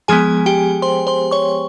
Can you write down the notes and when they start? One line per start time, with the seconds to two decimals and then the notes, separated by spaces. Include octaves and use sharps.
0.08 F3 G#3 B3 G#4 G#5
0.46 G4 G5
0.82 C5 C6
1.07 C5 C6
1.31 C#5 C#6